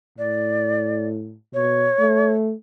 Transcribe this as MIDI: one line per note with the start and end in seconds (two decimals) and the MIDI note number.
0.18 1.35 45
0.18 1.06 74
1.54 1.89 47
1.54 2.32 73
2.00 2.53 57